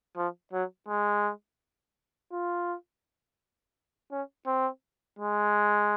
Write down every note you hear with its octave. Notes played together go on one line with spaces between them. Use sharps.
F3
F#3
G#3
F4
C#4
C4
G#3